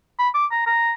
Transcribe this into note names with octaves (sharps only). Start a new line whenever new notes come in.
B5
D6
A#5
A#5